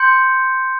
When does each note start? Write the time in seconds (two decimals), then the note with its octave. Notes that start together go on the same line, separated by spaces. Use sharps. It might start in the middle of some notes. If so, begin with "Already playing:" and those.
Already playing: C6 G6 C#7